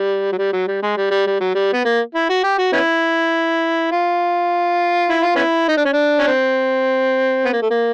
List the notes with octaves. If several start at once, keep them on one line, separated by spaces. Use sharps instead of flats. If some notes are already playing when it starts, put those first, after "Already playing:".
Already playing: G3
F#3
G3
F#3
G3
G#3
G3
G3
G3
F#3
G3
B3
A#3
E4
F#4
G4
F#4
B3 C#4 E4
F4
E4
F4
B3 C#4 E4
D#4
D4
C#4
D4
C#4
C4
B3
A#3
A3
A#3